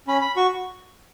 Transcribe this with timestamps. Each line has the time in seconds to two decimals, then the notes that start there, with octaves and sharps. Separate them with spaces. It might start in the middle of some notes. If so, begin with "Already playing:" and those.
0.08 C#4 B5
0.21 B5
0.36 F#4 C#6